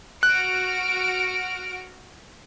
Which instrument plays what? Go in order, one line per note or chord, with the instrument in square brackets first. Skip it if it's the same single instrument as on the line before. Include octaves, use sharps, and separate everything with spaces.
[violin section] F#4 F6 D7 [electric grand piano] F#6